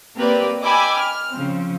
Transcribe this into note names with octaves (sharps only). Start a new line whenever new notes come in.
A#3 C4 G4 A#4 B4 D5
D#5 G5 G#5 B5 D6 E6
F6
C#3 F3 C4